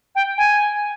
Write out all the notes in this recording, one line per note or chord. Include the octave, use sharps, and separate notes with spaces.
G5
G#5